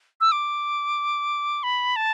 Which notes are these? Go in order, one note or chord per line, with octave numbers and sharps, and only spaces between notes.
E6
D6
B5
A5